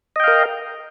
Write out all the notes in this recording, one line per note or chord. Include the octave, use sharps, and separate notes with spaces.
A#4 D#5 F5 G5